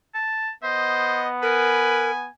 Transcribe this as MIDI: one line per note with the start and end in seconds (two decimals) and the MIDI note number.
0.15 0.51 81
0.64 2.28 59
0.64 1.25 72
0.64 1.29 75
1.42 2.11 70
1.42 2.14 71
1.42 2.31 80